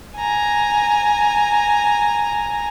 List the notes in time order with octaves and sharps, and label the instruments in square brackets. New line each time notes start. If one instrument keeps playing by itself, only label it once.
[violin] G#5 A#5